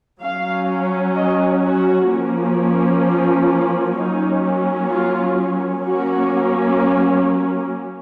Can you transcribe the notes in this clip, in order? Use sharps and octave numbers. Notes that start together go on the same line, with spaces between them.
F#3 C#4 F5
D#5
F#4
F3 A#3 C#4
F4
F4
F#3 A#3 C#4 D#4
F4
F#3 A#3 C#4 F#4